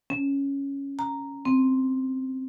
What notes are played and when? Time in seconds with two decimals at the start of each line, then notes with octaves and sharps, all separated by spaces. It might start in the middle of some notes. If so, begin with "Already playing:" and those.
0.10 C#4
0.99 A#5
1.45 C4